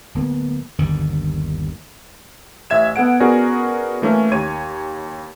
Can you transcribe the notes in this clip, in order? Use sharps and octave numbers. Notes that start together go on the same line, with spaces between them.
D1 A#3 B3
G1 D#2 D3 D#3
A1 E5 G#6 E7
B3 A4 F#5 D7
B3 C#4 F#4 G#4 A#4 D5
E3 A3 A#3 C#4
D#2 C#5 G#6 D#7